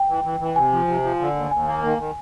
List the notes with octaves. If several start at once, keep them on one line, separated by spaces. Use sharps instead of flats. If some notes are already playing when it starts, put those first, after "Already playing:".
Already playing: G5
E3
E3
E3
C3 G#5
F3
C3
F3
D3
D#2
D#2 G#5
A#3
D#3
D#3